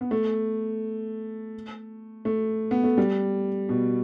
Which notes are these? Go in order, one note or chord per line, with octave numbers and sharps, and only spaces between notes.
B3
A3
A3
B3
A3
G3
B2